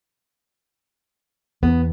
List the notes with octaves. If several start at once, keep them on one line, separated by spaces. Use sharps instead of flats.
E2 B3